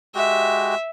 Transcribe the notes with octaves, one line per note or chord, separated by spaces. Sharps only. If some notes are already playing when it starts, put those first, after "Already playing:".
G#3 F#4 G4 E5